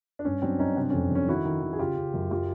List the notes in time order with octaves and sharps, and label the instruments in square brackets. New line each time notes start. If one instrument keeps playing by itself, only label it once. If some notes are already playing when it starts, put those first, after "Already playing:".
[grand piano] D4
G2 C#4
F#3 C4 D4
G2 C#4 D#4
C3 C4 D4
F2 C#4
F2 C#4
D#3 E4 F#4
D#3
D#3
G#4
C#3 F4 G4
C#3
F#2
F#3 F4 G4